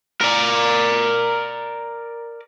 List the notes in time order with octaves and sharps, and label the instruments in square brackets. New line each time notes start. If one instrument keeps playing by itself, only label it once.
[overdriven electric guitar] A#4 D5